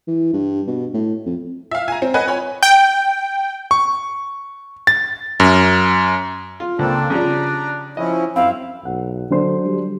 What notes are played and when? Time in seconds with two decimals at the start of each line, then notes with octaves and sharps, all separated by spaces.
0.08 E3
0.33 G2
0.67 B2
0.94 A2
1.26 F2
1.71 E5 F5
1.88 G#5 A#5
2.02 C4
2.14 B4 D#5 F#5 G#5
2.28 C#5 G#5 B5
2.63 G5
3.71 C#6
4.87 A6
5.40 F#2
6.60 F4
6.79 C#2 A#3 C4 D4 A4
7.10 C#3 F3 G3 A#5
7.97 F3 C#4 E4 D#5
8.36 F#2 C4 E4 F5
8.85 B1 F#5
9.30 D3 F#3 D4 C5
9.66 G3